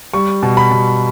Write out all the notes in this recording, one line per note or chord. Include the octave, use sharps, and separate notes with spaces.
G3 C#6
B2
B5
B2